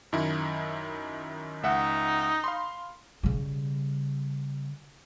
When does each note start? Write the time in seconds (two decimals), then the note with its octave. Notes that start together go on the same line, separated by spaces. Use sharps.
0.13 F#2 D#3 E4
1.63 C#2 D#4 E5 F#5
2.44 F5 B5 C6
3.23 C#3 G3